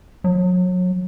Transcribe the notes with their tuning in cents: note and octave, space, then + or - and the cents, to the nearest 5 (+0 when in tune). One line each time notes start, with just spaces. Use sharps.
F#3 -30